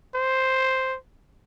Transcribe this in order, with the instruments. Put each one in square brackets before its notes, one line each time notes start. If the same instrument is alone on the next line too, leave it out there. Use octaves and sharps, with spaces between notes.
[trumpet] C5